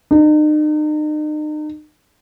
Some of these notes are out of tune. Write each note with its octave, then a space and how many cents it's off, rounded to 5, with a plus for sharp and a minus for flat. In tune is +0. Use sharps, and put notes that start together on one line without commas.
D#4 -40